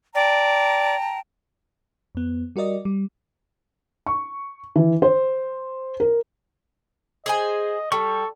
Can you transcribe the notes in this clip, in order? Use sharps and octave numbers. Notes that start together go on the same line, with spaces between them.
D5 G5 A5 A#5
F2 B3
G3 F#4 A#4 D5 D#5
G3
C#6
E3
C5
A#4
G#4 C5 D#5 G#5
G3 A4 C#6